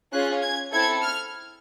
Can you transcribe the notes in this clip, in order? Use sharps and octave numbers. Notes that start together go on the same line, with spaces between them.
C#4 F4 G#4 F#6
G#6
C4 E4 A4 G#6
F6